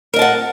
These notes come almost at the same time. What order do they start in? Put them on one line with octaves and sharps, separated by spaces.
A#4 D#5 A5 F#5